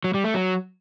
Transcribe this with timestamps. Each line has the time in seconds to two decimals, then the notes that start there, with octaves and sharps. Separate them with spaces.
0.04 F#3
0.14 G3
0.24 A3
0.34 F#3